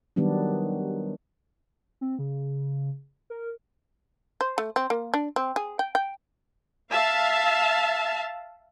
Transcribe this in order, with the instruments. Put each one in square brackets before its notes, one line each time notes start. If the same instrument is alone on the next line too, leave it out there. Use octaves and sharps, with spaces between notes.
[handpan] D#3 F#3 G3 B3 D4
[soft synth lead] C4
C#3
A#4
[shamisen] C5
A3
C4
A#3
D4
C4
G#4
G5
G5
[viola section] E5 F5 A5